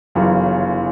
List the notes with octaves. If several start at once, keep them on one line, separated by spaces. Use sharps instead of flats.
G1 F#2 C#3 E3